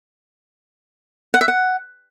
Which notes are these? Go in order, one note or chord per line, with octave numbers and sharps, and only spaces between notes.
F#5
E5
F#5